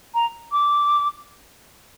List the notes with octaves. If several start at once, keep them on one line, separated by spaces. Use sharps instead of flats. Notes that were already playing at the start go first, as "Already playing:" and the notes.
A#5
D6